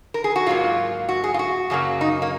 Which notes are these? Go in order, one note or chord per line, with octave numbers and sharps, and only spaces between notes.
A#4
G#4
F#4
G#2 F#3 A#3 F4
F#4
G#4
F4
F#4
F#2 C#3 F#3 A#3
D#4
A#3